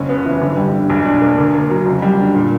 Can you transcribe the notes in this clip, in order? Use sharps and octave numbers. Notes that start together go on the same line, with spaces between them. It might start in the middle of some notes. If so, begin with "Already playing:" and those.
Already playing: F#1 C#4
B3
E3
G1
G3
D3
B1
D4
A#3
D2
A#3
F#3
F#1
G3
D3
A#2